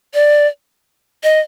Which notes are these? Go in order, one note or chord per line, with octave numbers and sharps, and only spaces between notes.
D5
D#5